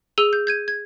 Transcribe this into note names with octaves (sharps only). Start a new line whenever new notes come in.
G#4 E6 D#7 F7 G7
G6
G6 G#6 D#7
G#6